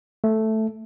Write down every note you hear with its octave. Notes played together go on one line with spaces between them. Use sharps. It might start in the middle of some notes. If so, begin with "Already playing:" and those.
A3